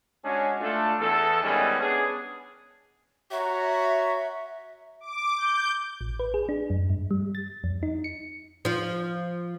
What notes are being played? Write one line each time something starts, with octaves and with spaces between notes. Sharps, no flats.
G#3 C#4 D4 F#4 G#4
A3 D4 F4 A4
E2 A4
D#3 G3 G#3 B3 C#4
B3 C#4 D4 G#4
F#4 C#5 E5 A#5
D6
G6
A1
B4
G#4
D4
F#2
G2
G3
A6
F2
D#4
C#7
F3 F4